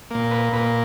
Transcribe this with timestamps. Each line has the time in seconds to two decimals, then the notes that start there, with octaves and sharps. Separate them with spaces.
0.11 A#2 A#3
0.31 B4
0.53 A#2 B4
0.56 A#3